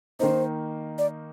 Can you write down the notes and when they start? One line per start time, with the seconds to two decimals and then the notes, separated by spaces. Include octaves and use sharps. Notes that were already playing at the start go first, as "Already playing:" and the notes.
0.19 D#3 A#3 D#4 C5
0.98 D5